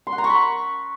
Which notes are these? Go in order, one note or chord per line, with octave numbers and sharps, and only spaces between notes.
C6
F#5
A#5
C#6
B5